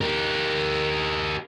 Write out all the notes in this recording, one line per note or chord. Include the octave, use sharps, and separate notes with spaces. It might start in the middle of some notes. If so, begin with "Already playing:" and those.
G4 A#4